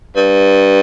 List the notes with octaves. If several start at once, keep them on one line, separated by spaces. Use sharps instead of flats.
G2